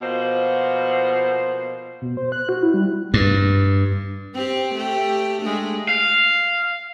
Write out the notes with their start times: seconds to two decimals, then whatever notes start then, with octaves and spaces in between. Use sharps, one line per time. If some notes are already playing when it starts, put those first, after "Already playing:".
0.02 B2 F3 A#3 C5
2.02 B2
2.17 C5
2.32 F#6
2.49 F#4
2.62 E4
2.74 G3
3.14 G2
4.34 C4 G4
4.74 A3 G4
5.41 G#3 A3 D4
5.89 F5